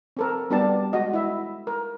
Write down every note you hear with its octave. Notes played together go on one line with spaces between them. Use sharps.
C4 A4 A#4
G3 B3 D4 G4 D5 A5
G#3 F#4 D#5
E4 E5
A#4